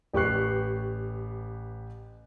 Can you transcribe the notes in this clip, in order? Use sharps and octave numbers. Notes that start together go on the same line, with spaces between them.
A1 G4 B4 C#6 F#6 C7